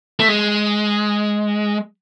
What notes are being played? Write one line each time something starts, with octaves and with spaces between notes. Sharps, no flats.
A3
G#3